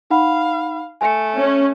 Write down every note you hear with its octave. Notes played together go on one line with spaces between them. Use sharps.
D#4 F5 F#5 B5
A3 G#5 C#7
C#4